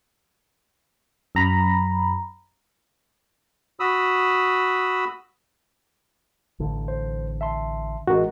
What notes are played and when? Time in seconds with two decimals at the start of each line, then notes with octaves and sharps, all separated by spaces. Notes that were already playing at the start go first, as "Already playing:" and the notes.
1.35 F#2 A#5 B5
3.80 F#4 B5 D#6 E6
6.60 A1 D3
6.88 C5
7.41 E5 A5 C6
8.07 A1 G#3 F#4 A#4